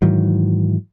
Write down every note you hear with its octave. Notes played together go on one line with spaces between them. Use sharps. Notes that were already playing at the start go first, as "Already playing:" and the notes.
G#2 D#3 E3 F#3